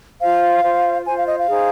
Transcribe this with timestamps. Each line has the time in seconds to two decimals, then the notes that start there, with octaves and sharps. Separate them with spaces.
0.20 F4 C5 F5
0.63 F4 C5
1.06 F4 C5 G#5
1.17 F5
1.27 D#5
1.38 F5
1.49 D#4 G#4 C5